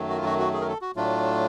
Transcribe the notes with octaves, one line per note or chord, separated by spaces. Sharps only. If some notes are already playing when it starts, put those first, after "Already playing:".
Already playing: F#2 D#3 F#3 A3
F#4
F4
F#4
F#4
G#4
A#4
A4
F#4
A2 F#3 A3 D4 F4